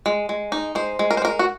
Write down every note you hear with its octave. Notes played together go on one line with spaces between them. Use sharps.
G#3
G#3
D#4
G#3 C5
G#3
A#4
C5
G#3 A#4
F#4